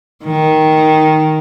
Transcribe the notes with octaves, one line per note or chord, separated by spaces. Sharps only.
D#3